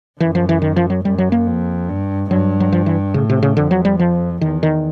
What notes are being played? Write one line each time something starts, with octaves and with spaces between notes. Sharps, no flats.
F#2 E3
F3
E3
D#3
F3
F#3
F#2 G3
F#3
A#3
F2
G2
G2 F#3
F#3
F3
E3
A2 C#3
C3
C#3
F2 D3
F#3
G3
F3
E2 D#3
D#3